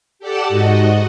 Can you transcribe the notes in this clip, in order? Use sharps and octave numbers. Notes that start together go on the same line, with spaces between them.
G4 A4 D5 F#5 A5
G#2 F#4 D#5